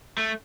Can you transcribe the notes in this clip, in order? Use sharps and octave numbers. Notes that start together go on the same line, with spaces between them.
A3